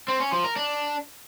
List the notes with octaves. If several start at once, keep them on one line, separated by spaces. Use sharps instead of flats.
C4
C#4
F3
A#4
D4